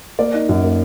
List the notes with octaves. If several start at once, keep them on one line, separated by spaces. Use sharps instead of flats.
A#3 D5
D#4
F#2
A#3